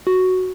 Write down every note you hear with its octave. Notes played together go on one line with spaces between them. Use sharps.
F#4